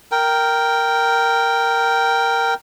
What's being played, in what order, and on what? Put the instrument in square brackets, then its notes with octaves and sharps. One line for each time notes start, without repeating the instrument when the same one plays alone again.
[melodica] A#4 G5